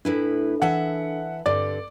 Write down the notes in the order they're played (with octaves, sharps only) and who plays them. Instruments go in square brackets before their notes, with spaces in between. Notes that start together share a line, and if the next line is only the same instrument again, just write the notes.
[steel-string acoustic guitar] A2 E4 B4 [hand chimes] D4 A4
[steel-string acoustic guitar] E3 E5 A5 [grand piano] F#5
[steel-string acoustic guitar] G2 D3 C4 [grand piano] D5